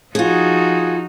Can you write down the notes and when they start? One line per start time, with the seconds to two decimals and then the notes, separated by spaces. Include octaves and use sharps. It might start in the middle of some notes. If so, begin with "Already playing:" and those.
0.15 F3 D#4 F4 F#4 G#4